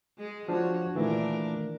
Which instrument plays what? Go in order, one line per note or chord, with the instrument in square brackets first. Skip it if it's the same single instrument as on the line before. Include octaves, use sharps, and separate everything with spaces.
[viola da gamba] G#3 G#4
[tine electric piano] F3 D4 [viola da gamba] F#4 C#5
[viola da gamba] A#2 D4 A#4 [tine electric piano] D#3 E3 A3